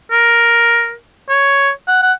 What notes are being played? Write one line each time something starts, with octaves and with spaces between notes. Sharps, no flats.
A#4
C#5
F#5
F#5